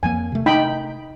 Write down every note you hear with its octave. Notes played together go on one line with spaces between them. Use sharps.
F2 F3 A#3 G#5
C3 A3
D#4 G5 B5